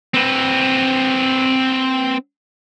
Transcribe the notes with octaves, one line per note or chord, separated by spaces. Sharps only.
C4 B4